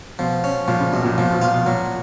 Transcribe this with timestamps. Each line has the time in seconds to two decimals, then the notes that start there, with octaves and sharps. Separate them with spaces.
0.19 B2 F3
0.44 C#4
0.68 A#2 F3
0.80 C#3
0.93 F#2 B2
1.05 A#2
1.18 A#2 F3
1.30 B2
1.42 A#2 F4
1.54 B2
1.66 A#2 F#3